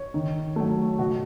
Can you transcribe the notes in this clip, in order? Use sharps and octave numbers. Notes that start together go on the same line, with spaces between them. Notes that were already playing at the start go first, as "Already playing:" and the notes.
Already playing: C#5
D#3
F#3 A3
B2 F#4